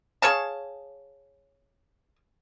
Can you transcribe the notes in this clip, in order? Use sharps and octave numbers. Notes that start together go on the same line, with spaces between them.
G#4 C#5 F5 A5